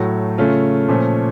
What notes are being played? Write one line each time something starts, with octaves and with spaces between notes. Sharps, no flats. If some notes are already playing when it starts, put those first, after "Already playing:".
Already playing: A2 F#3 A3
C#3 A3 C#4 F4
A#2 F3 A3 C#4